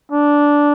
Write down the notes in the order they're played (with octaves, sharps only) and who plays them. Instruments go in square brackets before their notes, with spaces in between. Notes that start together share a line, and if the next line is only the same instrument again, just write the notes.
[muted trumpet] D4